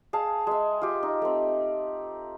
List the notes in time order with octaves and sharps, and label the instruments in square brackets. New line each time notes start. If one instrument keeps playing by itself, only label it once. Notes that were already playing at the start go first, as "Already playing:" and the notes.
[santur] G#4 F5 A5
G#3 E5
F4 G4
D#4
A3 C4